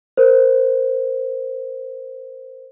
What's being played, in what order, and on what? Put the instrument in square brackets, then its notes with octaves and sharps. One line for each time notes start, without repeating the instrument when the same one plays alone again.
[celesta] A#4 C5